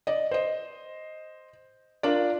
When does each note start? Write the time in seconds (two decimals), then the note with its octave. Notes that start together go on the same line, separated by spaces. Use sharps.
0.07 D5 D#5
0.31 C5 D#5
2.03 D4 F4 A#4 D5